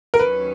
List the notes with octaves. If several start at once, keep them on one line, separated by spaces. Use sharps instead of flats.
A#4
D#2 D#3 F#3 C#4 B4